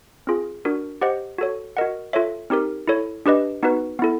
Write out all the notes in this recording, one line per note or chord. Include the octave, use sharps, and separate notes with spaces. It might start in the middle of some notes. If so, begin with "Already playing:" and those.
C4 F4 G#4
D4 F#4 A#4
G4 C5 D#5 F#5
F#4 A4 C#5
F#4 A#4 D#5 F#5
F4 A4 C#5 E5
C4 D#4 G4 A#4
E4 A4 C#5
D4 G4 B4 D#5
B3 D#4 F#4 B4
B3 E4 A4